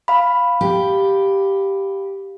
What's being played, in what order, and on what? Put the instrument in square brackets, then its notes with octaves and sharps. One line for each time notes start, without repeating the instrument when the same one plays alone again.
[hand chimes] F5 B5
[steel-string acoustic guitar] G4